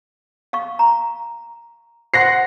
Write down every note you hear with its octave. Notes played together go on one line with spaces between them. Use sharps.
F5 C#6
A#5
C5 F#5 C6 A#6 C7